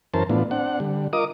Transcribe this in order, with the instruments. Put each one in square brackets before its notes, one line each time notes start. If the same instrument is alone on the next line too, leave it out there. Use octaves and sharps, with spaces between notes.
[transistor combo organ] F#2 E3 C#4 A#4 C5 A5
A2 E3 B3 D4 F4
C4 D4 F#5
D3 G3
F4 A#4 D#5 D6 D#6